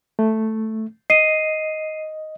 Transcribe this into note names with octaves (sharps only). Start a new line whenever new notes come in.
A3
D#5 C7 D#7